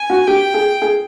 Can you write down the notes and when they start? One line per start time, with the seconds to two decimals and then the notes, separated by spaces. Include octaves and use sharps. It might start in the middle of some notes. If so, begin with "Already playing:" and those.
Already playing: G#5
0.10 F#4
0.28 G4 G5
0.54 G#4
0.82 G#4